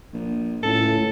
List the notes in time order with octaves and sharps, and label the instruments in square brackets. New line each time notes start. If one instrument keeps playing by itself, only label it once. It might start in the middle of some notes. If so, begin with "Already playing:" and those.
[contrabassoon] A#1
[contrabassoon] C#2 [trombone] A2 [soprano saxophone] A4